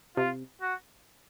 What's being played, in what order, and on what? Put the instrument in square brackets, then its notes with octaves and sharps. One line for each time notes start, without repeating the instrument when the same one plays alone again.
[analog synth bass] C3 [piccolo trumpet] F4
[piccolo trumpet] F#4